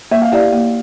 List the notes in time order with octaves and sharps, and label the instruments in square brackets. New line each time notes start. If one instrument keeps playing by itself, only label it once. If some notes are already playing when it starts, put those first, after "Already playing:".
[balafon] A#3 [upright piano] E5
[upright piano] F5
[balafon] E4 G4 D5 [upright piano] F5
[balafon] A#3